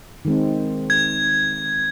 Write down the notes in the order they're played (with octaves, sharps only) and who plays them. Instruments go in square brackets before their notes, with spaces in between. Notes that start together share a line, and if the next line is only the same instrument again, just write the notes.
[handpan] D#3 G#3 C4
[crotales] G#6